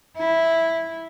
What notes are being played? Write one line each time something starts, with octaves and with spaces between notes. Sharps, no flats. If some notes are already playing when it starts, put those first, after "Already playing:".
E4